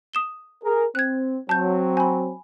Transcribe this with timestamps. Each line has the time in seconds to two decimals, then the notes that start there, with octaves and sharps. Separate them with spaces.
0.14 D#6 E7 G7
0.63 G#4 A#4
0.95 C4 F#6 G#6
1.49 F#3 C4 A5 G6
1.97 G#5 B5